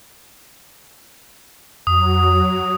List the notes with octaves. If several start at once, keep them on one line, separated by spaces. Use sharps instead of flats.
F2 F#3 D#6